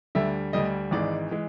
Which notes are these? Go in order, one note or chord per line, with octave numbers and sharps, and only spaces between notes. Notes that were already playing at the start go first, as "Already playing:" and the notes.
D2 D3 G3 E5
D2 D3 G3 D#5
G#1 G#2 E3 G#3 D5
E3 G#3